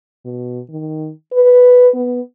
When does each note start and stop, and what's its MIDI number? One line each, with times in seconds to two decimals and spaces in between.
0.25 0.60 47
0.69 1.10 51
1.33 1.89 71
1.94 2.21 59